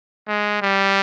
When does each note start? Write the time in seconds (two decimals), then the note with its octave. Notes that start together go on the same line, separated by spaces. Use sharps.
0.27 G#3
0.62 G3